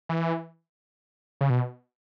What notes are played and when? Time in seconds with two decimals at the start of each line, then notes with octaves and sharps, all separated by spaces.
0.09 E3
1.41 C#3
1.50 B2